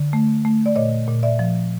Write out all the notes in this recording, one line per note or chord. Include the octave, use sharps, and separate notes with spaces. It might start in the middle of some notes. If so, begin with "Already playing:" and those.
Already playing: D3
A3
A3
D5
A#2 C#5 D#5
A#2
D5 E5
F3